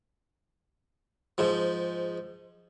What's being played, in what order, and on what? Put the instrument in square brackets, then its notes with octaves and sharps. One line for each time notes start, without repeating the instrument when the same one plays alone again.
[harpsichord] G#2 F3